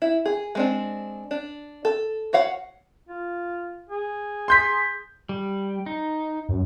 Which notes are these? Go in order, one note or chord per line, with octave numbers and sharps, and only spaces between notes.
E4
G#4
G#3 C4 D4
D4
A4
F#4 C#5 F5 F#5
F4
G#4
C6 G6 B6
G3
D#4
F#2